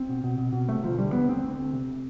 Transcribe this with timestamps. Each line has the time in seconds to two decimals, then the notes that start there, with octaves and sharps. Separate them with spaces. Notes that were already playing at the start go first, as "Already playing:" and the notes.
Already playing: C4
0.09 B2
0.24 B2
0.38 B2
0.53 B2
0.68 C3 A3
0.83 D2 F3
0.99 D3 G3
1.13 D2 B3
1.28 D2 C4
1.43 D2
1.58 D2
1.73 C3